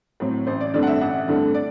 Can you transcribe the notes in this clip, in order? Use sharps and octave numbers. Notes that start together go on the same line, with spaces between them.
A2 F#3 C4 E4
A1 C5
D5
G2 D3 A3 C4 D5
F#5
E5
A1 F#5
G2 D3 A3 C4
D5